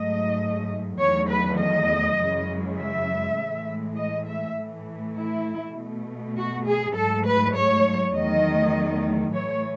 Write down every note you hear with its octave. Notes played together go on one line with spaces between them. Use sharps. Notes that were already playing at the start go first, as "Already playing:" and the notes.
Already playing: G#2 F#3 A3 D#5
E2 D#3 F#3 A3 C#5
B4
D#5
F#2 C#3 E3 G#3
E5
A2 E3 G#3
D#5
E5
A2 E3 A3
E4
B2 A3
F#4
G#4
G#2 F#3 A3 A4
B4
C#5
E2 D#3 F#3 A3 D#5
A2 E3 A3 C#5